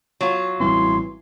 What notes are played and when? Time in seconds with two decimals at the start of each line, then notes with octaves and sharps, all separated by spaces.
0.21 F#3 F4
0.60 A1 E3 G3 C4 C6